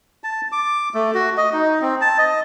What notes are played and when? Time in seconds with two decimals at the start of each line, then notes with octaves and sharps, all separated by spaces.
0.24 A5
0.52 D6
0.94 A3
1.14 F#4
1.37 D#5
1.53 D#4
1.82 C4
2.01 A5
2.18 D#5